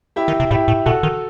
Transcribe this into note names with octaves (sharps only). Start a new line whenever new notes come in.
E4 G4
D#3
C3
A2 E4 G4
A2
B2 F#4 A4
D#3